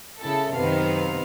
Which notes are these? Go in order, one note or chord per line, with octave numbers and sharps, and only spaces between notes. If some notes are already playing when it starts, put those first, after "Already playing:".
C#3 E4 A4
F#2 C3 D#3 B3 F5